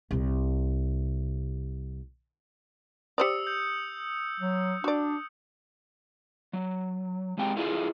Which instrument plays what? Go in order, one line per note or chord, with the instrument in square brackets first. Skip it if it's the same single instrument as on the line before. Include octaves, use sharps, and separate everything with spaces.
[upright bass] C2 C3
[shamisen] G4 C5 D5 [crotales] D#6 E6 C#7
[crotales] G6
[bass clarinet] F#3
[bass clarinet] D4 [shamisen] F#4 D5
[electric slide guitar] F#3
G#3 C4 G4 G5
E4 F4 G#4 A4 D5 E5